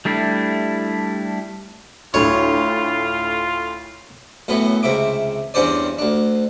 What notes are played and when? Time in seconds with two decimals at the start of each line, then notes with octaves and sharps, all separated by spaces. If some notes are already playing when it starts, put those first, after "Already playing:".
0.05 G3 A3 D4 E4
2.14 D2 A2 F4 C#5
4.48 F#2 A2 F#3 B3
4.83 C#2 C3 E5 D6
5.54 E2 G2 C4 C#4 C5 D5
5.98 D2 D4